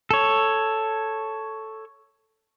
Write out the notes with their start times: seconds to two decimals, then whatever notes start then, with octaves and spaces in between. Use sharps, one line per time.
0.11 A4 C#5